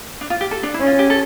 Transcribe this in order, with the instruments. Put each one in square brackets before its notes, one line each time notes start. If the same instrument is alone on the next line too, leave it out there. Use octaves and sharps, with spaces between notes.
[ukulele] D4
F4
G4
A4
D4
E4
[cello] C#4
[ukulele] F4
G4
A4